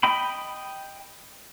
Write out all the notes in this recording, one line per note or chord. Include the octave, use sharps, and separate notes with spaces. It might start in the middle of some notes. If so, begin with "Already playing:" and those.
D#5 G5 B5